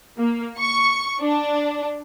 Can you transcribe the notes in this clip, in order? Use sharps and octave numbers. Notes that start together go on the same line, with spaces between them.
A#3
C#6
D4